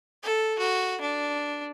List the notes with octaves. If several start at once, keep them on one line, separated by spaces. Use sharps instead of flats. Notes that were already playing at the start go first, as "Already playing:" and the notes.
A4
F#4
D4